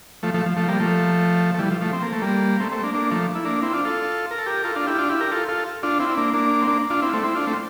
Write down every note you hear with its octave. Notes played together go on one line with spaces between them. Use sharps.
F3 A3
F3 A3
F3
F3 A3
G3 A#3
F3 A3
A3
E3 G3
F3
F3 A3
C4
A#3
A3
G3 A#3
A3 C4
A3 C4
A#3 D4
A#3 D4
F3 A3
E4
A#3 D4
C4 E4
D4 F4
F4 A4
A#4
A4
G4 A#4
F4 A4
D4 F4
E4 G4
D4 F4
E4 G4
G4 A#4
F4 A4
F4 A4
D4 F4
C4 E4
E4
A#3 D4
A#3 D4
C4
A#3 D4
D4 F4
C4 E4
A3 C4
C4 E4
D4 F4
A3 C4